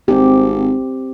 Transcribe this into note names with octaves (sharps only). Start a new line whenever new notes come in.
G#1 C4 G4